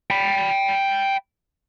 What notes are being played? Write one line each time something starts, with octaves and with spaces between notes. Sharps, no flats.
G5 B5